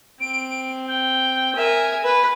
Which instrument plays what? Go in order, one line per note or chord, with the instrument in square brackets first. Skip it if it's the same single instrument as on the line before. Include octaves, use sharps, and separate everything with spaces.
[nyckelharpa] C4 [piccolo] D7
[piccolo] G5
[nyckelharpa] A#4 E5 [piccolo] G#5
[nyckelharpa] B4